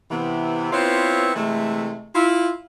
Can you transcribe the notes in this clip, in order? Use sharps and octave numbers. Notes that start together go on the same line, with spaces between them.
C3 E3 B3
B3 C4 E4 F4 B4 C#5
C3 E3 G#3 A3
E4 F4